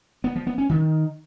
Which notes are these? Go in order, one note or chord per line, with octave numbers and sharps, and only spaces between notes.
B3
F3
B3
C#4
D#3